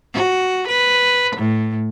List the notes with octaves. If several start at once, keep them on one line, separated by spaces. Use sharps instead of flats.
F#4
B4
A2